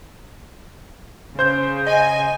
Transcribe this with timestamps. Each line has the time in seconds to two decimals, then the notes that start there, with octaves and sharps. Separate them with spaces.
1.39 C#3 C5 G6
1.87 D#5 G#5